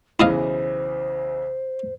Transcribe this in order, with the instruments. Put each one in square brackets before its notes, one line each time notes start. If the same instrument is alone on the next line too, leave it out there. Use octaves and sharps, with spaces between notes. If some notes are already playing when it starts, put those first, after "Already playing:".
[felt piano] B1 C#3 E3 [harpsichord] E4 D#5 F5 [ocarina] C5